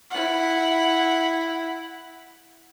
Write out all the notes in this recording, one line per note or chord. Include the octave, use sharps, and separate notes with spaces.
E4 F#5